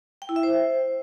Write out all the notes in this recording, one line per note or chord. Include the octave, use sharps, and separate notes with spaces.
G5
E4
E5
C5